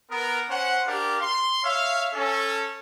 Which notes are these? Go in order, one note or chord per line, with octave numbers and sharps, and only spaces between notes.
B3 A#4
C#4 C5 F#5
D4 G4 A#4 F5
C6
C#5 E5 F5
C#4 A4